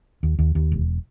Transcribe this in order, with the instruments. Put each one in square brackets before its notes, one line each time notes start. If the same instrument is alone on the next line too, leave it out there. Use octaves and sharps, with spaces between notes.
[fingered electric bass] D#2
D#2
D#2
E1